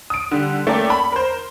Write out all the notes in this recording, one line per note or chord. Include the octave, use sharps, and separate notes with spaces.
D#6 D7
D3 G3
A3 A#3 C#4 A4 D5 G5
B5
A#4 C5